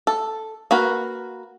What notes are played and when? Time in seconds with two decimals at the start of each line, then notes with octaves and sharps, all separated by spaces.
0.07 A4
0.71 A#3 F#4 B4